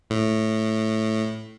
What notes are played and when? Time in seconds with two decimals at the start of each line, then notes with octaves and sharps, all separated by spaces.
0.10 A2